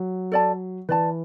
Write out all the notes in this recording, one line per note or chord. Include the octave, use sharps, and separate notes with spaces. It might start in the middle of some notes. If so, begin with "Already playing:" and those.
Already playing: F#3
A4 D5 A5
E3 B4 D5 A5